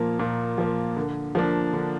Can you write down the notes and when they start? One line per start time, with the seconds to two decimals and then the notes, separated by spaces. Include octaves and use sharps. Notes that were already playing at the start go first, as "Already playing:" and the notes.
Already playing: A#2 F3 A#3
0.19 A#2
0.58 F3 A#3
0.96 D3
1.35 F3 A#3 D4
1.73 D3